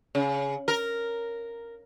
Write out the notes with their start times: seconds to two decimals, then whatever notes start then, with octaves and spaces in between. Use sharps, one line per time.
0.15 C#3
0.68 A#4